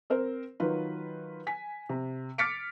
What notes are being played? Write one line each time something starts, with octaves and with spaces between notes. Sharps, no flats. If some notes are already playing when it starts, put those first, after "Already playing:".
C4 A#4 C5
D#3 F#3 F4 B4
G#5 B6
C3
D6 F6 A6 B6 C#7 D7